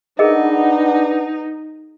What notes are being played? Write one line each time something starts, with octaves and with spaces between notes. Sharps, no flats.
D4 D#4 G#4 A#4 B4 D#5 F#5